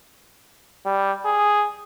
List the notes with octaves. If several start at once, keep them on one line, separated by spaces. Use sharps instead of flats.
G3
G#4